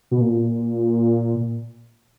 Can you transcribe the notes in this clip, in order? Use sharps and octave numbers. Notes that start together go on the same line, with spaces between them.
B2
A#2